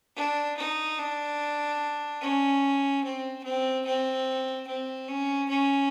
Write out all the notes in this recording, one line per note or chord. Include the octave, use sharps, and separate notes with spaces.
D4
D#4
D4
C#4
C4
C4
C4
C4
C#4
C#4